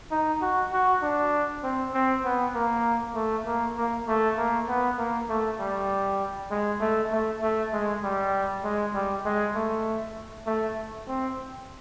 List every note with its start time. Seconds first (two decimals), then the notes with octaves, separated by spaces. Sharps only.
0.11 D#4
0.41 F#4
0.72 F#4
1.02 D4
1.63 C4
1.94 C4
2.25 B3
2.54 A#3
3.15 A3
3.46 A#3
3.77 A#3
4.08 A3
4.38 A#3
4.68 B3
4.98 A#3
5.29 A3
5.60 G3
6.51 G#3
6.81 A3
7.12 A3
7.42 A3
7.72 G#3
8.03 G3
8.64 G#3
8.94 G3
9.25 G#3
9.55 A3
10.46 A3
11.08 C4